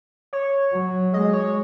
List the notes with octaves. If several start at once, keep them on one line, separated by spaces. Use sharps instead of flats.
C#5
F#3
G#3 D#5
C#5